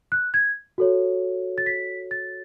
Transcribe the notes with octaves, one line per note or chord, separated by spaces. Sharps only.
F#6
G#6
F#4 A4 C#5
A6
B6
A6